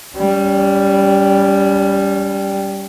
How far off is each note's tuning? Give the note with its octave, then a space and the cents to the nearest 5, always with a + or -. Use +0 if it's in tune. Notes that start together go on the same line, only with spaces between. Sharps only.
G3 +0 C#4 +35